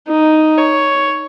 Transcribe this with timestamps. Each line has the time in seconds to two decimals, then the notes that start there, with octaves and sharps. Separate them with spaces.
0.08 D#4
0.58 C#5